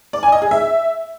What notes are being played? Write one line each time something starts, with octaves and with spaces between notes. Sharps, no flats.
D5
G#5
D#5
G#4
E5